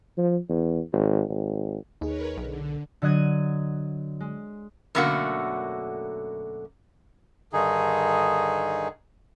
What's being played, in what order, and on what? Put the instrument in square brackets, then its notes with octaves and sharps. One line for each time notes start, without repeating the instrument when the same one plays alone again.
[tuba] F3
E2
G#1
G#1
[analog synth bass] D#2 [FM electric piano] D#4 G#4 [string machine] A#4 B4 C#5
[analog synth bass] B1 [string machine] D3
[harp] D3 F#3 D#5 F#6 G#6 D#7
G#3
[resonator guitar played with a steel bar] F#2 B2 D3 A3 A#3 F#4
[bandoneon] G2 D3 D#3 D#4 G#4